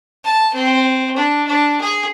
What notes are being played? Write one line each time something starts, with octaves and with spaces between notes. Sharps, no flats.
A5
C4
D4
D4
G#4